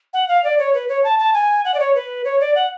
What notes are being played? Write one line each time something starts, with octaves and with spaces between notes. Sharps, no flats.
F#5
F5
D5
C#5
B4
C#5
A5
A5
G#5
F#5
D5
C#5
B4
C#5
D5
F#5